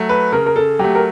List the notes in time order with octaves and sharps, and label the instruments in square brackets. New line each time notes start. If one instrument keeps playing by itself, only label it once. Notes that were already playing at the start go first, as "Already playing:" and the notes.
Already playing: [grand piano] F#3 A3
[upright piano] B4
[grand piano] C#3 [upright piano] A#4
[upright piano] A#4
A4
[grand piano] F#3 A3 [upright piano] G4
[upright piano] A#4